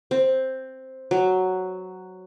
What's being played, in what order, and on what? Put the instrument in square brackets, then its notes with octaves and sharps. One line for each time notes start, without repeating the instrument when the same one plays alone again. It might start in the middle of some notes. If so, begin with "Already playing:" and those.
[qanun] C4
F#3